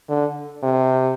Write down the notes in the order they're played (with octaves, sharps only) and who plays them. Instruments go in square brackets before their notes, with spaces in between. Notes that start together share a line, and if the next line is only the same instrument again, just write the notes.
[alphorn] D3
C3